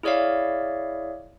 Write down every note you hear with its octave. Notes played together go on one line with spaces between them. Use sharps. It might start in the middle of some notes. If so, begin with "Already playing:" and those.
E4 G#4 C#5 D5 E5 F5